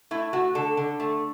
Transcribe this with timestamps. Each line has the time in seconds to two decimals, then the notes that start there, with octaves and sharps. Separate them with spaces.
0.11 A3 E4
0.33 A3 F#4
0.55 D3 A4
0.77 D3
1.00 A3